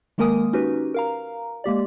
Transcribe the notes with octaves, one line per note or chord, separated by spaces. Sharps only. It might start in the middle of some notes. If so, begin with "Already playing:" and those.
D#3 G#3 A#3 A#4 G#5 D#6
C#4 D#4 F#4 G4 B4
A#4 F5 A#5
G#3 A#3 G4 D5